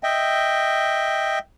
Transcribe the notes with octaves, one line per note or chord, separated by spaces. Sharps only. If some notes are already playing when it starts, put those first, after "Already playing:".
D#5 E5 G5